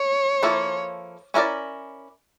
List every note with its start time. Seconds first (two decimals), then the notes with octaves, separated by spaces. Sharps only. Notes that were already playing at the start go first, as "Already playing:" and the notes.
Already playing: C#5
0.43 F3 A#3 E4 A4
1.34 C#4 E4 A#4 D5